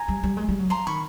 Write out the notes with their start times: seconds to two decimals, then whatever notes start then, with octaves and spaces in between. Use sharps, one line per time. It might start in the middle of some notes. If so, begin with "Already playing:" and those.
Already playing: G#5 A#5
0.08 G3
0.23 G3
0.37 G#3
0.49 G3
0.59 F#3
0.70 F3 A#5 C6
0.87 D#3 B5 C#6